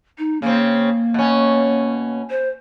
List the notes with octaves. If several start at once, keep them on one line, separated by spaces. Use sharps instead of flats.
D#4
C#3 A#3 C4
B2 C#4
C5